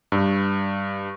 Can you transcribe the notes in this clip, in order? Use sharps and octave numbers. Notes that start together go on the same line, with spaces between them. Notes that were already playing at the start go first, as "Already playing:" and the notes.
G2